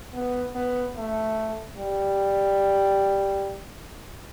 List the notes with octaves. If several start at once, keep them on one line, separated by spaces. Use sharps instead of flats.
B3
B3
A3
G3